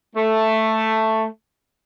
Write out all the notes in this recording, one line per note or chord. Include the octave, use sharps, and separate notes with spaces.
A3